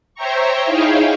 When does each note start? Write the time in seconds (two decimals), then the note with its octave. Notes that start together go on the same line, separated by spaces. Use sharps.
0.15 C5 C#5 E5 G5 A#5 C#6
0.64 D#4 E4 G#4 C#5 F5 G5